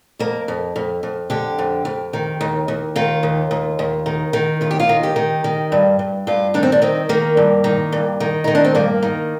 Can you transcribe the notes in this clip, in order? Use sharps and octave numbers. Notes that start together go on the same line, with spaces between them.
F2 A#3
F2
F2
F2
D3 G4
F2
F2
D#3
D#2
D#2
D#3 F4
D#2
D#2
D#2
D#3
D#3
D#2 F4
G4
F4
D#3
G4
D#3
D#3
G2
G2
G2 F4
D#3 D4
C4
D4
D#3 C4
D#3 A#3
G2
D#3
G2
D#3
D#3 D#4
D4
C4
G2 A#3
D#3